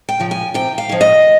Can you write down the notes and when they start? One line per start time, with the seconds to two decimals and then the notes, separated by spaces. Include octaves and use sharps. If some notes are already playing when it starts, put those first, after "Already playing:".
0.09 G5
0.20 C#3 F3
0.31 G#5
0.54 C3 G5
0.78 F5
0.89 F3 G#3 C#4
1.01 D#5